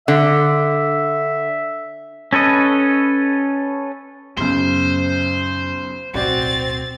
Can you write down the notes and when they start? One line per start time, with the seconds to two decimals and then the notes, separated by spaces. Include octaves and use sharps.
0.08 D3 E5
2.33 C#4 A4 B4 D#5
4.37 B1 F#2 C#3 C5 G7
6.14 D1 B1 C4 F#4 C5 D5 A6